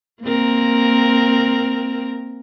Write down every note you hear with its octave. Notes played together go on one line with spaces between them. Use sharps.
A#3 C4 A#4